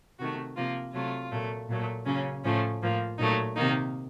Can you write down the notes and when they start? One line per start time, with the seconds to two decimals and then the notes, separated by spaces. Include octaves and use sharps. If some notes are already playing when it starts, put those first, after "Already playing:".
0.19 C3 D#3 A3 F#4
0.57 C3 F3 A#3 F4
0.94 C3 F#3 A3 F4
1.31 A#2 F#3 A3
1.68 A#2 F#3 A3
2.06 C#3 F#3 A#3 C#4
2.44 A2 F3 A3 C#4
2.81 A2 F3 A#3
3.18 A#2 F#3 A3 D#4
3.56 C3 D#3 A#3 D#4